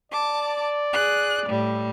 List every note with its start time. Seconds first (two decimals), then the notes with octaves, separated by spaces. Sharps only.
0.12 D5 A5 D6
0.93 G#4 F#6
1.48 A2 G3